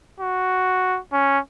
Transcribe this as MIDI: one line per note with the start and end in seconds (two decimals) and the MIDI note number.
0.20 0.99 66
1.12 1.39 61